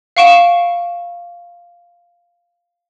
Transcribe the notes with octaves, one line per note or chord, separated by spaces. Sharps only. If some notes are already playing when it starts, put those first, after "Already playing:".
F5 F#5 C#6 D7 E7